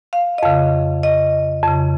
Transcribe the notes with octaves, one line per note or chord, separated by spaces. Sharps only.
F5
D#5
F2 C#3 F5
D#5
F2 C#3